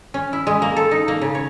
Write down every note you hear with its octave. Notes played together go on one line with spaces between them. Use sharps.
C#4
E4
G#3
A#3
A4
D#4
A#3
C#3
C#5